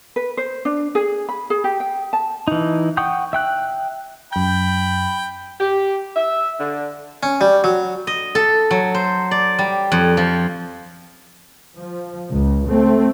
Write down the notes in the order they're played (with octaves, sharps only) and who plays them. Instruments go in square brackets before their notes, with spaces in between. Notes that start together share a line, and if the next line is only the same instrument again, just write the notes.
[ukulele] B4
C5
D4
G#4
B5
G#4
G4
G5
A5
[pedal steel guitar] E3 D#4
F#5 G5 C#6 D#6 G6
E5 G5 F#6
[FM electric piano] F#2 G6 [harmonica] G5 B5
[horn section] G4
E5
D3
[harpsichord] C#4
G3
F#3
[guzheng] D#5
A4
F#3
C5
D5
G3
F2
F3
[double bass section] F3
C#2
A3 C4